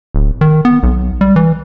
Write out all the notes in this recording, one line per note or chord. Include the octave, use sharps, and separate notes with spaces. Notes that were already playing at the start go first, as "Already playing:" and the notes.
D1
D#3
B3
B1
G3
E3